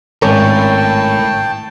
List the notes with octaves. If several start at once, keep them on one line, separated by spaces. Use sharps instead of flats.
G#1 A2 C#4 A#4 C#5 D5 G5 A5